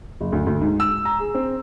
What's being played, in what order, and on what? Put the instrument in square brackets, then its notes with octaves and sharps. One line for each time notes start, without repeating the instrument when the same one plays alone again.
[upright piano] F#1
D2
D2
G#2
E6
A#5
G#4
C4